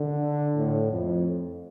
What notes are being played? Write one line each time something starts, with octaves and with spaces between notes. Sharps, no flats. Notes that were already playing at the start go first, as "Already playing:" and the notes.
Already playing: D3
A2
F2